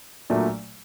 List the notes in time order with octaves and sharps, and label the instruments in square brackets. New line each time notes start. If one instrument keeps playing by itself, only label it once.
[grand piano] A#2 F#3 A3 D4